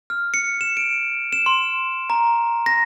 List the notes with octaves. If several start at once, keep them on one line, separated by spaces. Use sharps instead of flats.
F6
C#7
E7
D7
E7
C6
A#5
A#6